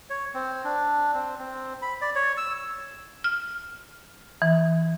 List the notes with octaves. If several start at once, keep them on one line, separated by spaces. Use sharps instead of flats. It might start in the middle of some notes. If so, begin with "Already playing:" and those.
C#5
C4
D4
C4
C4
B5
D5
C#5
E6
F6
E3